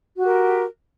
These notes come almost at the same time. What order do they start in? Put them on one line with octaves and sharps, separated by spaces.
F#4 G4 A#4